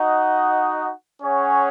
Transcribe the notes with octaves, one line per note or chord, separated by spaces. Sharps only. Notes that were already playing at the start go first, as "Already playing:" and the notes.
Already playing: D#4 F#4 D#5 F#5
C#4 G#4 C#5 F#5